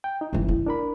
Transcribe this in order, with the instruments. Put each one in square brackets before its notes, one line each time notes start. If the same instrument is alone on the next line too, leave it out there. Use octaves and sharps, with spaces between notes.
[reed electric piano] G5
D#4
[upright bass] G1 D2 [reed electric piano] G2 C#3 E3
[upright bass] E4
[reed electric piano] D4 A#4 B5